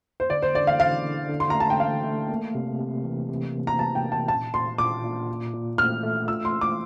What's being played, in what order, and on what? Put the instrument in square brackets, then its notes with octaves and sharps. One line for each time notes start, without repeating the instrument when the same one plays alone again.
[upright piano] C5
[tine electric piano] D3 [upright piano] D5
[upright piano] C5
[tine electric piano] D3 [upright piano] D5
[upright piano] F5
[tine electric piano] E4 [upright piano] F5
[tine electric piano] D3
D3
[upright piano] C6
[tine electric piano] A3 [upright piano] A#5
[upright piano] A5
G5
[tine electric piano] D3 [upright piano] F5
[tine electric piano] A3
A#3
C3
C3
E3
C3
A#3
[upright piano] A#5
[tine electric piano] E3 [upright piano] A5
[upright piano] G5
[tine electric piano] A#3
[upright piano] A5
[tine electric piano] A#2 [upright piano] A5
[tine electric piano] A#2 [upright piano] C6
[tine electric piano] A#2 [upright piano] D6
[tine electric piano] A#2
A#2
A#2
[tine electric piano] A3 [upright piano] F6
[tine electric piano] A3
[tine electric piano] F4 [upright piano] E6
[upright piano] C6
[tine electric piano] A3
[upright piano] D6